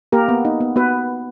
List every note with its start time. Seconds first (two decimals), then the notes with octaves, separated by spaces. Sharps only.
0.12 A#3 G4 A#4
0.28 B3
0.45 D#4
0.61 B3
0.76 B3 F#4 B4